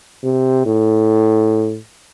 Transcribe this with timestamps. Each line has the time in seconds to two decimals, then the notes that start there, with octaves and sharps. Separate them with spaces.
0.24 C3
0.66 A2